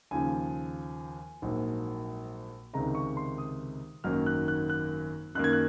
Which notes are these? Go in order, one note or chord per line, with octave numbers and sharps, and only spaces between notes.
D#2 C#3 F3 G#5
A#1 G#2 F#3 A#3
C#2 C3 D#3 G#3 A#5
C#6
C6
D#6
G#1 F#2 D#3 F#3 A#3 F6
F#6
F#6
F#6
F#2 D#3 A#3 F#6
G#6
F#6